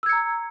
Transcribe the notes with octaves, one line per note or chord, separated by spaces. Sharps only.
A#5 E6 G#6 C#7